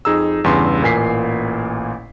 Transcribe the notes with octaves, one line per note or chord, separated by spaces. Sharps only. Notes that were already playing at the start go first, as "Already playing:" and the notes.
F2 D#4 G#4 A#5 E6
E2 G2 C#3 C6
A1 A#2 A#3 G#5 B6 C7